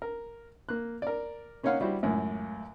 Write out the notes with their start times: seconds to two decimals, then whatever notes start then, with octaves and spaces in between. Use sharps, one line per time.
0.02 A#4
0.69 A#3 F#6
1.02 A#4 D5
1.63 A#3 C#4 D#4 C#5 F5 F#5
1.81 G3 E4 F#4 C5
2.03 C#2 F#2 A2